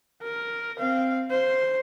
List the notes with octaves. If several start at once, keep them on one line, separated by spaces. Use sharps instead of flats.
A#4
C4 F5
C5